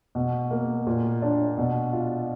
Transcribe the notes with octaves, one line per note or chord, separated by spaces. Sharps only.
B2
A#3
A#2
D4
B2
F4